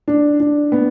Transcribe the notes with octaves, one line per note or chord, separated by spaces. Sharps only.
D4
D4
B3